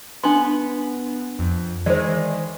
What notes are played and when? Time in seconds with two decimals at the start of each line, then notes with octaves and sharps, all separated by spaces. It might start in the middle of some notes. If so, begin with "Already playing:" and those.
0.23 B3 D4 C6
1.39 F2
1.86 D#3 E3 G#3 C5 D5